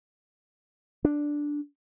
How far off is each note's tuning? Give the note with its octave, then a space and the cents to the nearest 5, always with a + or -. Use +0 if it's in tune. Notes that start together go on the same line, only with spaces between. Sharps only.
D4 +0